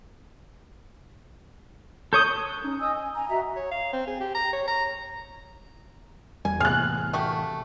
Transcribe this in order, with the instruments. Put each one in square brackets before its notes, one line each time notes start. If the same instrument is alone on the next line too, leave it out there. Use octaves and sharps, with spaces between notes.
[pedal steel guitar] A4 C#5 D#6 [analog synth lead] G6
[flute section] F#6
C#4 D#4
D#5 G#5 D#6 E6
G#5
G#5 A#5
F#4 D#5 E5 A#5
[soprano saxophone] C#5
F5
C4
G#4
G4
A#5
C#5
A#5
[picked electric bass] E2 G3 [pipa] G#5
[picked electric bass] A2 C3 E3 [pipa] G#4 [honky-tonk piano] F6 F#6
[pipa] A3 F#4 G4